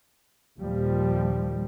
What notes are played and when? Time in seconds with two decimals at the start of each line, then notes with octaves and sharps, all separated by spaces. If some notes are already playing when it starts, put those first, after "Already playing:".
0.58 D#2 A#2 F3 G3